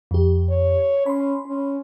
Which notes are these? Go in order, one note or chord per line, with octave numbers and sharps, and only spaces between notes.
F2 G4
C#5
C#4 B5 C6
C#4